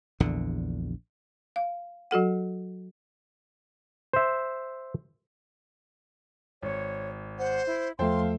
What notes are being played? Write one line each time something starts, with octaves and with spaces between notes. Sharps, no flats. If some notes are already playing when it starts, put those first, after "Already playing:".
A#1 E2 D3
F5
F#3 F#4 A4 F#5
C5 E5
G#1 C#5
C5 F#5
E4
E2 F3 A3 A4 C5 F5 G5 C6